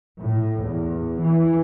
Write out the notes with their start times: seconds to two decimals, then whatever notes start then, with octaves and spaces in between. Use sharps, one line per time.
0.21 A2
0.66 E2
1.22 E3